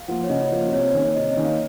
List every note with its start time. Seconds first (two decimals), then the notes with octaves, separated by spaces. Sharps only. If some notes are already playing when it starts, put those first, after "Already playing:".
Already playing: F5
0.08 F3 A#3 F4 F#5
0.24 C#5
0.29 C#3 D#5
0.51 F3 A#3 F4
0.72 C3 C#5
0.94 D#3 A#3 C#4
1.15 C3 D#5
1.30 D#5
1.37 D#3 A#3 C#4
1.45 F5